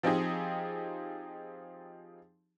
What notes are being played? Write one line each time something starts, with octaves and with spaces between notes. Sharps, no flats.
F3 C4 D#4 G4 G#4